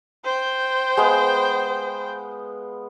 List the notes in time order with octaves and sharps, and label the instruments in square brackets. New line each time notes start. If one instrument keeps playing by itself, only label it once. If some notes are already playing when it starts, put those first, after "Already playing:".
[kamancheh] C5 G5
[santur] G#3 B3 F5